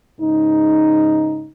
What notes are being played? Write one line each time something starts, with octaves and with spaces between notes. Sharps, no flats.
G#2 C#3 D#4